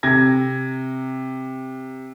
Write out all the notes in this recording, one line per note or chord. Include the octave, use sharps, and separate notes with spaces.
C3 G#6 A#6